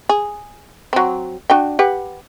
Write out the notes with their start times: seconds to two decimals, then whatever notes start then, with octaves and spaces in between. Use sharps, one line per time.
0.09 G#4
0.93 F#3 C4
1.50 D4 F#4 G5
1.79 G4 B4 F#5